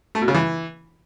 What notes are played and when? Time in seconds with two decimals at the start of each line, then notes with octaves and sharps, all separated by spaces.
0.15 A3
0.21 B2
0.28 C#3
0.34 E3